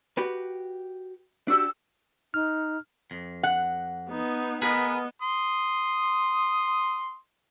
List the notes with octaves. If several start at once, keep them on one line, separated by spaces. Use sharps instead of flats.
F#4 G4 B4
D4 F#4 G4 E6
D#4 F6
F2
F#5
B3 D#4
B3 G#4 A#4 B4 D#5
C6 D#6